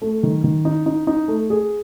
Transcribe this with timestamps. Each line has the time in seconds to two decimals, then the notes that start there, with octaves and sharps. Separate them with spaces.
0.02 A3
0.23 D#3
0.44 D#3
0.65 D#4
0.86 D#4
1.07 D#4
1.28 A3
1.50 G#4